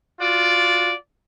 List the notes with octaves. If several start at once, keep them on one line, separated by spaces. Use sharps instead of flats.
F4 F#4 D5